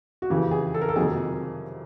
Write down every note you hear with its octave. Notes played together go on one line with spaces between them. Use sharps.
F#4
F2 C#3 E3 G4
G#4
A4
A#4
A4
F2 C3 D#3 F#3 G#4